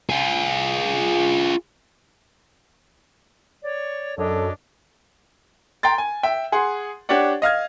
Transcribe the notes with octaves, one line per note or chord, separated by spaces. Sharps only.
F4 G#4
C#5 D5
F#2 D4 A4 C#5 D#5
G5 A#5 C6 A6
G#5
E5 G5
G#4 F#5 C6
D4 G4 C#5 D5 F#5
D#5 F5 F6 G#6